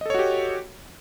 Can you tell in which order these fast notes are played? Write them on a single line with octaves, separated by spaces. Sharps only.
D#5 A4 C#5 F#4 G4